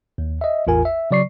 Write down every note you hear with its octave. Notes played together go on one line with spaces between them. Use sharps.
D#2
D#5 E5
A1 E2 F4 A#4 G#5
E5
C#3 F#3 D5 C#6 C7